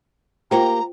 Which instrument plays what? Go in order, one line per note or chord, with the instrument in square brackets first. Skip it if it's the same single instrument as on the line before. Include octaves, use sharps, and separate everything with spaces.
[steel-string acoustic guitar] A#3 G4 [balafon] F4 C5 G5 [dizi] A#5